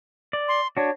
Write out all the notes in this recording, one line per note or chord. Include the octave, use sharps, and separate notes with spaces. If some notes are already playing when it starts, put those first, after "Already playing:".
D5
C6
D4 F#4 C#5